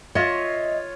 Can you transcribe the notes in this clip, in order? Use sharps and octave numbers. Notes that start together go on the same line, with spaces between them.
F4 C#5 D#5 E5